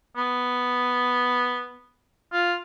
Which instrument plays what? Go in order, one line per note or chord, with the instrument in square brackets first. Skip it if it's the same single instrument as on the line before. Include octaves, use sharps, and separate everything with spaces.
[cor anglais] B3
F4